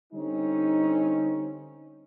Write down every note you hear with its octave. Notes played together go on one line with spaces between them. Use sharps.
D3 G3 C4 C#4 D#4